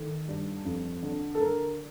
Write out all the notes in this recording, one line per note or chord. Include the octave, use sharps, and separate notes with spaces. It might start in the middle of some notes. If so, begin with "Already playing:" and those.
Already playing: D#3 A4
G2
F2
D3
A4
D3 A#4